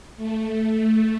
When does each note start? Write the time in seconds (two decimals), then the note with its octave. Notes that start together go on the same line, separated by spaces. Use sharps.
0.16 A3
0.62 A3